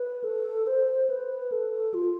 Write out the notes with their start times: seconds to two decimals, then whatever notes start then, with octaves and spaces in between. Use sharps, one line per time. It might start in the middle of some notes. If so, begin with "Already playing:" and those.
Already playing: B4
0.24 A4
0.67 C5
1.10 B4
1.52 A4
1.94 F4